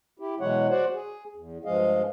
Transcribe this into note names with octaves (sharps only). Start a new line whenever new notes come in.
E4 G4
B2 E3 F#3 G#3 C#5 F#5
F#4 C5 D5 F#5
G#4
E2
G2 F3 G#3 G#4 D#5 F5